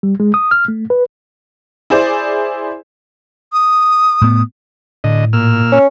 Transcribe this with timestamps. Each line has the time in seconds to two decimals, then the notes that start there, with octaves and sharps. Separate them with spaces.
0.03 G3
0.20 G#3
0.34 D#6
0.51 F6
0.68 A3
0.90 B4
1.90 E4 G#4 C5 D5
3.53 D#6
4.21 A2 B3
5.04 A2 D3 D#5
5.33 A#2 E6 F6
5.72 C#4